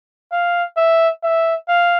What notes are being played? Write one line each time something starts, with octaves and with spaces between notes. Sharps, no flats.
F5
E5
E5
F5